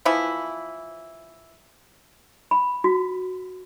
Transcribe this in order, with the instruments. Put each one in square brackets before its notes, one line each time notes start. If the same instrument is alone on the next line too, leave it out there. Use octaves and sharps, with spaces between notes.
[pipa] E3 F3 B3 E4
[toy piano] B5
F#4